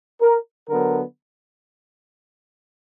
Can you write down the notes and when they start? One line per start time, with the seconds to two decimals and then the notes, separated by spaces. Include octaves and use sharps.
0.21 A#4
0.69 D3 F#3 B3 A#4